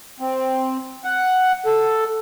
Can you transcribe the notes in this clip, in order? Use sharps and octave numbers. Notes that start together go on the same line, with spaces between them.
C4
F#5
A4